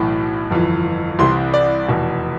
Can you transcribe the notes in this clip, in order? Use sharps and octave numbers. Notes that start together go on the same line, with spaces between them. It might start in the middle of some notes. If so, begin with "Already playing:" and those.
Already playing: B1 A2 E3
G1 F2 E3
C2 C3 E3 C6
D5
F1 E2 B2